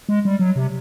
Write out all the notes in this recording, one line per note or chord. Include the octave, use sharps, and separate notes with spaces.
G#3
G3
F#3
C3